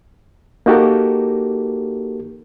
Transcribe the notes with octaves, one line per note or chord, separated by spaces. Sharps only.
A#3 D#4 F#4 G4 A4 A#4